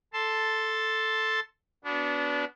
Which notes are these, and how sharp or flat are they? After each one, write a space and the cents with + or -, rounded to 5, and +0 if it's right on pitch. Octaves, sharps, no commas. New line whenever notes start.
A4 +0 A5 +0 C6 +0
B3 +0 D4 -25 F#4 +0